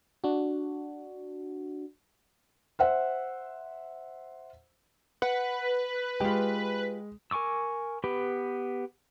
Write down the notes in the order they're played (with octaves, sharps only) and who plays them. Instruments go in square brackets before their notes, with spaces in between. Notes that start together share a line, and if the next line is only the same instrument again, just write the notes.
[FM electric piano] D4 F#4
[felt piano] C5 E5 F#5
[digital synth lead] B4 [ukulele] F#5
[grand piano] G#3 [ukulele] F4 G4
[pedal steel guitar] A#4 G#5 C#6 D6 E6
B3 G4 B4